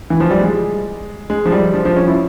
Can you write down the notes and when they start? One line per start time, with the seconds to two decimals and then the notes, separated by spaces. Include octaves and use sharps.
0.10 E3
0.20 F3
0.31 G3
0.41 G#3
1.30 G#3
1.46 F3
1.52 G3
1.74 F3
1.85 F3
1.96 C#4
2.08 E4